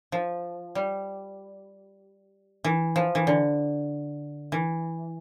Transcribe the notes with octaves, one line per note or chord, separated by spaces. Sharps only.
F3
G3
E3
F3
E3
D3
E3